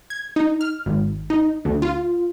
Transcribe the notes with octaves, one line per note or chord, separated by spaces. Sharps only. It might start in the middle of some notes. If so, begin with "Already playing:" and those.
G#6
D#4
F6
G#1
D#4
D2
F4